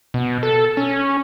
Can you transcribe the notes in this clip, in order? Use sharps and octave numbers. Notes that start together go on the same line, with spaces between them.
B2
A4
C#4